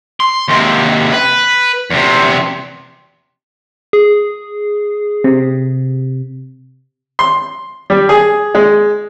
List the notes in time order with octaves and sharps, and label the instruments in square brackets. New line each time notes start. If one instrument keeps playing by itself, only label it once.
[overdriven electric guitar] C6
D#2 C3
B4
E2 C3
[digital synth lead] G#4
[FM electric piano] C3
[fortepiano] C6
G3
G#4
G#3